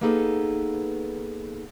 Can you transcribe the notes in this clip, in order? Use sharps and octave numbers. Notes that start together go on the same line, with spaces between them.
A#3 B3 D#4 G#4 A4 B4